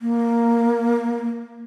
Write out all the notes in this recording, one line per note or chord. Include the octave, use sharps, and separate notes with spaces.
A#3